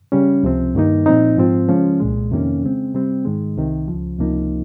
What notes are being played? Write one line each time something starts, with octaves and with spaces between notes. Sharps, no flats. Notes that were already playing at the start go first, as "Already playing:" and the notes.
C#3 G3 C#4
C#2 C3 F3 C4
G2 D#3 A#3 D#4
A#2 F3 C4 D#4
G#2 F3 C4 F4
C#3 F3 G#3 C#4
C2 A#2 G#3
F2 C3 D#3 A#3 C#4
C#3 G#3 C4
C3 G3 C4
G#2 D#3 G#3
C2 C3 D#3
C#2 C#3 F3
C#2 C3 F3 A#3 D#4